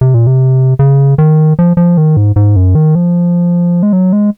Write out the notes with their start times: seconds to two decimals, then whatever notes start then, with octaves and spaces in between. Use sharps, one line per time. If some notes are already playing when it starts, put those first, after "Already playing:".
0.01 C3
0.14 A#2
0.27 C3
0.79 C#3
1.18 D#3
1.59 F3
1.77 F3
1.97 D#3
2.17 G#2
2.36 G#2
2.56 F#2
2.75 D#3
2.95 F3
3.83 G#3
3.93 F#3
4.13 G#3